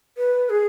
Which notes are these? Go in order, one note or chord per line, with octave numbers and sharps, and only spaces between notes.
B4
G#4